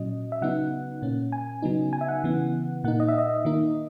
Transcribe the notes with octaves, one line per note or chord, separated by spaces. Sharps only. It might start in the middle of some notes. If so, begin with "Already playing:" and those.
Already playing: A#2 F#3 C#4 D#5
E5
C#3 F#3 B3 D#4 F#5
A#2 A#3 C#4
G#5
C#3 F#3 B3 D#4
G#5
E5
F#5
C#3 E3 B3
A#2 A#3 D#4 F#5
D#5
E5
D#5
D#3 A#3 D#4